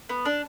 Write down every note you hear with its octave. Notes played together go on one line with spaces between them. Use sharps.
B3
D4